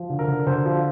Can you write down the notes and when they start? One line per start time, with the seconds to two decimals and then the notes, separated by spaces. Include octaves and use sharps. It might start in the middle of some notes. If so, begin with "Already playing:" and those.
Already playing: F3
0.10 D3
0.19 A#4
0.28 D3
0.47 D3 C5
0.65 F3